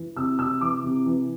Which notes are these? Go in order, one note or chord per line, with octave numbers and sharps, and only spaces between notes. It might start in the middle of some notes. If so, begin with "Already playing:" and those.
Already playing: E3
C3 E6
C3 E6
E3 D6
C3
E3